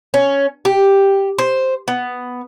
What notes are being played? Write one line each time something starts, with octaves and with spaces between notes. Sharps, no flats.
C#4
G4
C5
B3